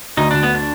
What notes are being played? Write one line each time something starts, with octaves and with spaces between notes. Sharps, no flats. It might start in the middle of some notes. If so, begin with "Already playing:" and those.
D2 D#4
D2 D4
B3
D4